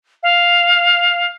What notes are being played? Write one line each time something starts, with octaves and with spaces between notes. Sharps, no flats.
F5